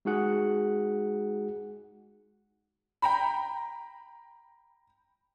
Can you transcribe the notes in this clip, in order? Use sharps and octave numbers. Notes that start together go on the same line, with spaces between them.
G#3 D#4 F#4 G#4 F#5
G5 A#5 B5